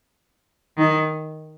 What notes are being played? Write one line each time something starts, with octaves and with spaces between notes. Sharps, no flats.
D#3